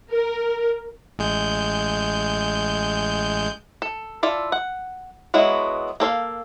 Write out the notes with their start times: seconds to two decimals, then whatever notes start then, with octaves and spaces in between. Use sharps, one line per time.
0.12 A#4
1.19 A1 G#3 G6
3.82 A4
4.23 E4 F4 A4 D5
4.52 F#5
5.34 F#3 G#3 B3 E4 F#4
6.00 A#3 A4 C#5 F5